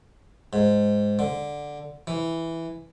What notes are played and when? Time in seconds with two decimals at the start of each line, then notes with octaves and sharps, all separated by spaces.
0.53 G#2
1.19 D3
2.07 E3